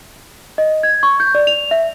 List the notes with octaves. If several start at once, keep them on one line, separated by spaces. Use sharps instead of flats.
D#5
G#6
C#6
G6
D5
F7
E5